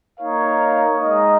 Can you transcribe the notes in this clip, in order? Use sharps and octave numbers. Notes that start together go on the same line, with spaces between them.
A#3 D#4 A#4 C#5 F5
G#3 D#4 A#4 D#5